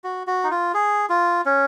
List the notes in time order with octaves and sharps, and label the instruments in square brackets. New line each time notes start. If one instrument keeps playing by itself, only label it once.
[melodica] F#4
F#4
D#4
F4
G#4
F4
C#4